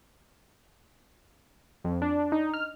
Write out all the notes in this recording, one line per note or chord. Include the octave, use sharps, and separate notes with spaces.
F2
D4
D#4
F6